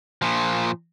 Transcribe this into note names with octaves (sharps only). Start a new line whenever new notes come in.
A#2 F3